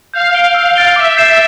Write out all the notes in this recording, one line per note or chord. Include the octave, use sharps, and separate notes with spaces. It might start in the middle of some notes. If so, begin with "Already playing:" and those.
F5 G6
D7 G7
F5 E6
A6 D7 G7
E5 D6
G6 C7 E7